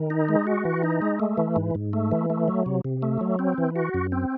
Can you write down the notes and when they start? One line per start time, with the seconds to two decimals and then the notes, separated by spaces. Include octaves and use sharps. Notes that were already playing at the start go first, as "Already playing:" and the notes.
Already playing: D#3
0.10 D#4
0.29 G#3
0.47 F#4
0.65 E3
0.83 D#4
1.02 G#3
1.20 A3
1.38 E3
1.56 G#2
1.75 G#2
1.93 A3
2.11 E3
2.30 A3
2.48 F#3
2.66 C3
2.85 C3
3.02 A3
3.21 F#3
3.39 C4
3.58 E3
3.76 F#4
3.94 F#2
4.12 C4